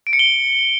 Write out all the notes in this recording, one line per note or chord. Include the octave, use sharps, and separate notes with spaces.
D7
C#7
G7